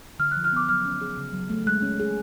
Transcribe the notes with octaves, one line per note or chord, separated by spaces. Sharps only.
D3 F6
F#6
F3
F6
B3 D6
F#3 F6
C#4
G#4
C#3
F#3
A3
G#3 F#6
C#4
G#4